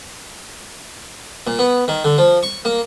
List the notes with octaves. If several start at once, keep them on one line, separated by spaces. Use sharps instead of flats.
A#2
B3
D#3
D3
F3
C#6
A#3